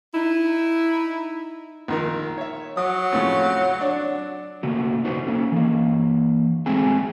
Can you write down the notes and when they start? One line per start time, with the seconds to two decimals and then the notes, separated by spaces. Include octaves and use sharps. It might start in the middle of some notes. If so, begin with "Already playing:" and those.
0.14 D#4 E4
1.88 A#1 D#3 A#4
2.38 C#5 E5
2.77 F#3 D#6
3.13 F2 A2 C#3
3.81 D4
4.63 C#3 A3 A#3 F#4
5.05 D#4 F#4 B4 C5
5.27 A#3 C#4 A4
5.52 E3 A#3
6.66 F#3 G#3 A3 C4 G#4 G#5